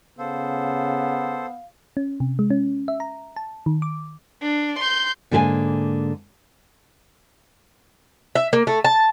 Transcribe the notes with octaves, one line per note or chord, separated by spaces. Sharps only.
C#3 B3 A4 C5 F5
C#4
C3
G#3
C#4
E5
A#5
A5
D#3
D6
D4
C6 G6
G#2 D3 A#3 G#4 F5 G#5
E5
A#3
A3
A5